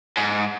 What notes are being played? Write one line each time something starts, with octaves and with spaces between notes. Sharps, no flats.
G#2